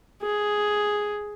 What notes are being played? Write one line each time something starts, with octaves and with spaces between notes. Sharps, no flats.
G#4